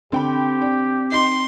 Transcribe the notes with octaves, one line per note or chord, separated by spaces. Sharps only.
D3 C4 G4 G5 B5
D4
D#4 C6 C7